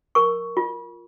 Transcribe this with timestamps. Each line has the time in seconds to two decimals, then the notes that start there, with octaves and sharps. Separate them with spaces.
0.15 A#4 C#6
0.57 F4